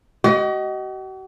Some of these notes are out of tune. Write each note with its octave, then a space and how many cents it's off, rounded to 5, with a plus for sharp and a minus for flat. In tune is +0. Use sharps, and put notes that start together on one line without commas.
F#4 +45 D#5 +0